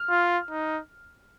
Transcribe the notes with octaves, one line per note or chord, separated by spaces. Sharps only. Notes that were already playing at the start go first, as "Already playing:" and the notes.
Already playing: F6
F4
D#4